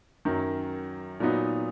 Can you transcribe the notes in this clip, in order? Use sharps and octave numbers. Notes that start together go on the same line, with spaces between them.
F#2 D#3 F#3
A#2 F#3 B3 D#4